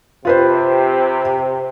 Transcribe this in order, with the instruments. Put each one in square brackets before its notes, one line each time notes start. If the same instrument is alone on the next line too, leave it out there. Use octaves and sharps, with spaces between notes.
[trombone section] C3 [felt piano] F4 B4 C5